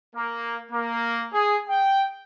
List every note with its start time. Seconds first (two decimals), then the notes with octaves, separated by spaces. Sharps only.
0.16 A#3
0.71 A#3
1.33 G#4
1.69 G5